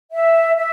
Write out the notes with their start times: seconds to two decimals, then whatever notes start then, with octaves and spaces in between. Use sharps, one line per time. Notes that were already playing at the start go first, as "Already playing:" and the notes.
0.12 E5
0.56 E5